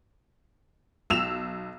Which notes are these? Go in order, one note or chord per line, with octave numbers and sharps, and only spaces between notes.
B1 E6 E7 F7